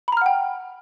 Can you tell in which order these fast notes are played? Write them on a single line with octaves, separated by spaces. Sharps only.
B5 A#5 F6 F#5 G5